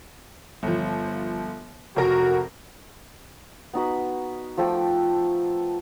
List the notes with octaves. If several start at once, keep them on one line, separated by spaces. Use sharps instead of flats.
G1 F3
F1 F#4 A#4 A#6
B3 D#4 F#4 B4
F3 A3 A4 G5